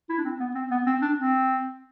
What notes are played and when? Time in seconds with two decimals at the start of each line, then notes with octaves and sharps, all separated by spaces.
0.09 E4
0.18 D4
0.24 C4
0.40 B3
0.55 C4
0.71 B3
0.86 C4
1.02 D4
1.18 C4